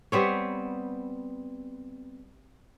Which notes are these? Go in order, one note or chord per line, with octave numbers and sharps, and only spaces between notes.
G3 B3 C4 C#5